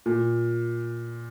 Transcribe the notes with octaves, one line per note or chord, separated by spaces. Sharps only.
A#2